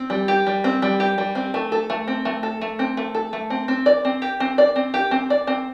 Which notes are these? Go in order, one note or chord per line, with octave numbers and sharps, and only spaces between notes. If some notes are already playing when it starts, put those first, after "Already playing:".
Already playing: C4
G3
G4
G3
C4
G3
G4
G3
C4
A3
A4
A3
C4
A3
A4
A3
C4
A3
A4
A3
C4
C4
D5
C4
G4
C4
D5
C4
G4
C4
D5
C4